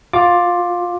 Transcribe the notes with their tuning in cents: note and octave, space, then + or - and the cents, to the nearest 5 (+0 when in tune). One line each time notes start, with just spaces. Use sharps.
F4 +15 D6 +0